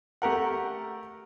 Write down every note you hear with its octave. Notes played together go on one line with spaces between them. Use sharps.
A3 G4 A#4 F#5